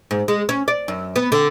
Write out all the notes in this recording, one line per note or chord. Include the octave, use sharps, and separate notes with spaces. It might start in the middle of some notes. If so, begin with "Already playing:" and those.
G#2
G#3
C#4
D5
F#2
B3
D3